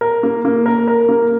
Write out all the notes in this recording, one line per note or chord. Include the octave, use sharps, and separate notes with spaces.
A#4
A#3
A#3
A#4
A#4
A#3